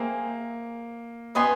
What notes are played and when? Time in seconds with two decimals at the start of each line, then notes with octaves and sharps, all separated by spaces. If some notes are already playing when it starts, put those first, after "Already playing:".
Already playing: A#3 G#4 C5 E5 G5
1.35 B3 B4 D#5 G#5 C6